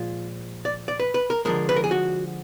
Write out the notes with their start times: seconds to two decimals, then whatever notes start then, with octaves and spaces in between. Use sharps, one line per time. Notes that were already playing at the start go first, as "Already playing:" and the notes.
Already playing: A#2 F3 G#3 F4
0.65 D5
0.88 D5
1.00 B4
1.14 B4
1.30 A#4
1.45 D3 F3 G#3 A#4
1.69 B4
1.76 A#4
1.84 G#4
1.91 F#4